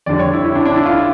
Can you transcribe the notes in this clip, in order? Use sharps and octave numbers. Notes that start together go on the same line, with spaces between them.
F2 D3 G3 D5
C#5
E4
E4
D4
D4
E4
F4